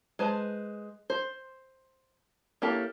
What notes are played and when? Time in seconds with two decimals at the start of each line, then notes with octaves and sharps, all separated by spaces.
0.19 G#3 B4 C5 A5
1.10 C5
2.62 A#3 C#4 E4 G4 A4